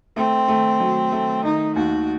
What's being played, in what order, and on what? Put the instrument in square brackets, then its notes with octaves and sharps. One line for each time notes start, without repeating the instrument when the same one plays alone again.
[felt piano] A3 [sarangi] C4
[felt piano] A3
F#3
A3
[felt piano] D#3 [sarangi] D#4
[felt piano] D#2 [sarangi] F#4